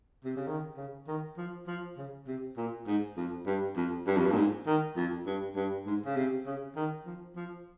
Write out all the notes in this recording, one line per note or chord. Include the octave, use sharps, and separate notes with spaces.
C3
C#3
D#3
C#3
D#3
F3
F3
C#3
C3
A#2
G#2
F2
G2
F2
G2
F2
G2
A#2
G#2
D#3
F2
G2
G2
G#2
C#3
C3
C#3
D#3
F3
F3